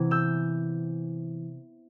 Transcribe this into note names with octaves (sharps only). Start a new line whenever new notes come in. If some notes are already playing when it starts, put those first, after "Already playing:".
Already playing: C3 E3 B3 E4
E6 G6